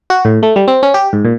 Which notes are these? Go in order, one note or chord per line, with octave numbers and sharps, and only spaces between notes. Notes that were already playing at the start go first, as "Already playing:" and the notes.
F#4
A2
A3
G3
C4
C#4
G4
G#2
A#2